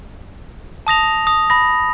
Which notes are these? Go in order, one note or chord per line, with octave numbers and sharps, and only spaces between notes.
A5 D#6 A#6 F7
D#6
B5 A#6